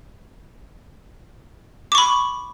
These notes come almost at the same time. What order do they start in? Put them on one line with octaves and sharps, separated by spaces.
D6 C#6 B5